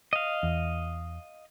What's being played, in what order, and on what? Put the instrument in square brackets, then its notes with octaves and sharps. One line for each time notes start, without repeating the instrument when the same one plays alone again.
[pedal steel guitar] D#5 F5
[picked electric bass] E2